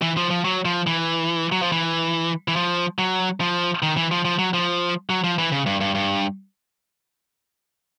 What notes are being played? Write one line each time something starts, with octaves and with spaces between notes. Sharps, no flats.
E3
F3
F3
F#3
F3
E3
F#3
F3
E3
E3
F3
F#3
F3
D#3
E3
F3
F3
F#3
F3
F#3
F3
E3
C#3
G2
G2
G2